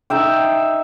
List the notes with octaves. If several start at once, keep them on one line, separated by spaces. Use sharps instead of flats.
D#4 E5 G5